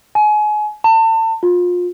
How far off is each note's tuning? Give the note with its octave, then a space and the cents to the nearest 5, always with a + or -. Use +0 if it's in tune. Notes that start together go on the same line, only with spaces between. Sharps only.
G#5 +30
A5 +35
F4 +30